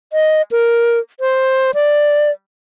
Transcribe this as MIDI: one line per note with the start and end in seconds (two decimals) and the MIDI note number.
0.13 0.42 75
0.51 0.99 70
1.20 1.71 72
1.75 2.31 74